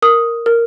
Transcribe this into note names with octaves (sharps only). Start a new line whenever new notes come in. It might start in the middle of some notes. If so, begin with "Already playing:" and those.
A#4 D#6
A#4